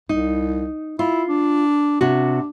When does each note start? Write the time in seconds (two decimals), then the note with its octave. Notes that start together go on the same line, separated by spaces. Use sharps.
0.09 C2 D#4
0.99 E4 F4
1.29 D4
2.01 C3 D4 F#4